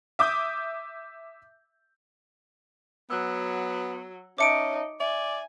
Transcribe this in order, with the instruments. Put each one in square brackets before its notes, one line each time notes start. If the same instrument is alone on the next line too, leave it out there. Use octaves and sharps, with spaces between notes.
[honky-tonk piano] E5 D6 D#6 G6
[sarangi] F#3 [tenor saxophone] B3 [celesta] E6 F#6
[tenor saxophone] C#4 [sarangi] D#4 [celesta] C#5 E5 A5 [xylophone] D6 C#7 D7
[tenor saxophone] D5 [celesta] E5 [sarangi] G#5